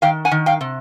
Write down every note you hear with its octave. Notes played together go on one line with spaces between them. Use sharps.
D#3 F5 G5
F#5 G#5
D#3
F5 G5
C3